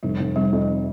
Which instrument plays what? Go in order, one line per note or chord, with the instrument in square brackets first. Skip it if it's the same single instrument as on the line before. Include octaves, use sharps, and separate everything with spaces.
[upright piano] F1 [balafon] G3
[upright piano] F1
[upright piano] C3 [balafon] G3
[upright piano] F2